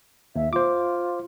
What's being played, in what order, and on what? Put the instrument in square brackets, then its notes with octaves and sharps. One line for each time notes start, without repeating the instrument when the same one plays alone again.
[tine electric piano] D#2 [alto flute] E5
[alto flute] F4 [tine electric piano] C5 D6